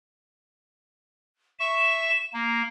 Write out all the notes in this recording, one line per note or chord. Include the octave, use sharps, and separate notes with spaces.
E5 C#6 E7
A#3 A#5